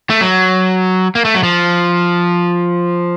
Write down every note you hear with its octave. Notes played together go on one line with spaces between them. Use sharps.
A3
F#3
A#3
A3
F#3
F3